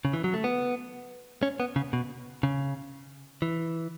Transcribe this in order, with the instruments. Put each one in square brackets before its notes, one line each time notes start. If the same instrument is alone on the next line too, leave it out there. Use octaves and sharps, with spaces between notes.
[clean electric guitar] C#3
E3
F#3
A3
B3
C#4
B3
C#3
B2
C#3
E3